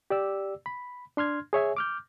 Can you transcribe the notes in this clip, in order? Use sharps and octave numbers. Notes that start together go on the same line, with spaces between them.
G4 D5 E6
B5
D4 C6 F6 G#6
G#4 C#5 E5 G#5
D6 F6 G6